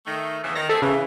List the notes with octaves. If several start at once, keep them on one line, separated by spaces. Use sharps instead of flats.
D#3 A3
E2 C#3 E3
D#3 A#6
A3 C4 G#4 A4
C#3 E3